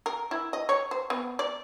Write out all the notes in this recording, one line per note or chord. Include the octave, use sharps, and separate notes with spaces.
A#4
E4
D#5
C#5
C5
B3
D5